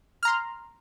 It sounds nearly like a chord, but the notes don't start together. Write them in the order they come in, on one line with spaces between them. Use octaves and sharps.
F6 A#5 C6